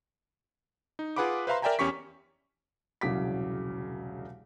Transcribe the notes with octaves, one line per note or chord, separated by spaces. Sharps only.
D#4
F4 G#4 B4 F#5 B5 D6
B4 C5 E5 F5 A#5 C6
A#4 D5 E5 G5 G#5 A#5
E2 C#4 G4 C#6 B6
E1 C2 C#3 F#3 D6 B6